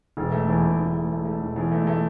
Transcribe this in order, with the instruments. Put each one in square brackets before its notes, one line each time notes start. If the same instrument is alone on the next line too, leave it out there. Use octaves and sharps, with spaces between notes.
[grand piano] E1
A3
E2
E1
E2
A3
A3
A3
E1
E2
A3
A3